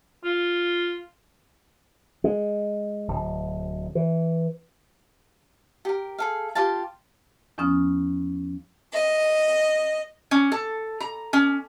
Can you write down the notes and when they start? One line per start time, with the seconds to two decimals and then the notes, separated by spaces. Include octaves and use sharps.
0.25 F4
2.24 G#3
3.08 D1
3.95 E3
5.85 G4 A#4
6.18 G#4 A4 F5
6.55 F4 G4 F5 A5
7.58 E2 F3 B3 C#4 D#6 F6
8.93 D#5
10.31 C#4
10.52 A4
11.00 A#5
11.33 C#4